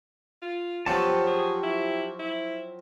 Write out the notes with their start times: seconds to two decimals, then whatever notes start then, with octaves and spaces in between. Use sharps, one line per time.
0.42 F4
0.86 F3 F#3 B3 C4 G4 C#5 A5
1.27 G#4
1.63 E4
2.19 E4